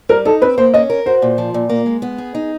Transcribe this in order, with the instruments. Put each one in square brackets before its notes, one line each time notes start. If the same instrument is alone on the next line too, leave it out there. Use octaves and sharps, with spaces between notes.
[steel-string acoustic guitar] G3 [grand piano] A#4
[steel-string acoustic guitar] D#4 [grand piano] A4
[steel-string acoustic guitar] C4 [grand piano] B4
[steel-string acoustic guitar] A#3 [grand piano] C5
[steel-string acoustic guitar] C#4 [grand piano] D#5
[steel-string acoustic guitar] A#4
[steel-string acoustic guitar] F#4 [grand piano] C5
[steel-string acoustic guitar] A#2
F3
A#2
A#3
G#3
B3
G#4
D#4